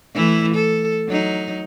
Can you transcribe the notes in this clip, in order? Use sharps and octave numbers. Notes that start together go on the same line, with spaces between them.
E3 A3 E4
A4
F#3 D#4